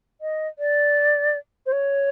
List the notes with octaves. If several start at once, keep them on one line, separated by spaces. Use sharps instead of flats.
D#5
D5
C5
C#5